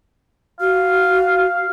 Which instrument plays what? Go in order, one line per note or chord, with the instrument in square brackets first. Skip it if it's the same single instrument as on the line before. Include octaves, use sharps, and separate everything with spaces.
[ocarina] F#4 [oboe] F5